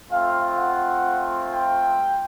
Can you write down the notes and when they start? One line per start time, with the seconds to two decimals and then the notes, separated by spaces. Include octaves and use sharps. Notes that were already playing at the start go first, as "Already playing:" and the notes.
0.11 A3 C4 F4 F5
0.58 F#5
1.52 G5